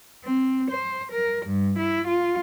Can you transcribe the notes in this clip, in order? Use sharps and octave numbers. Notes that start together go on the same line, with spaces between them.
C4
C5
A#4
G2
E4
F4